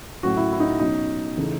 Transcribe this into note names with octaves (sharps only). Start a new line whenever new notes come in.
A2 F#3 C#4 F#4
E4
E4
D#4
B2 F#3 C#4 D#4
C#3 E3 A3 C#4